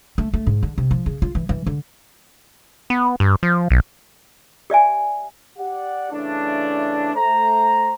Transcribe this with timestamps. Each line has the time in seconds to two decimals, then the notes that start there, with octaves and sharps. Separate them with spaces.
0.18 A3
0.34 A3
0.47 G#2
0.63 D3
0.78 C3
0.91 F3
1.06 C#3
1.22 F4
1.35 E3
1.49 E3
1.67 D3
2.90 B3
3.20 G2
3.43 F3
3.71 B1
4.70 G4 D5 E5 G#5
5.58 G4 D5 F#5
6.11 C#3 E3 A3 D4
7.15 A3 C5 A#5